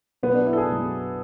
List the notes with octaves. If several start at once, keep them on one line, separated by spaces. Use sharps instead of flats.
B2 F#3 B3
D4
E4
A4
G#4
B2 F#3